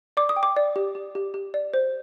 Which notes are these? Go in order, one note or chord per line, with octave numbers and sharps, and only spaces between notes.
D5 D6
D#6
G5
D6
D5
G4
G4
G4
G4
D5
C5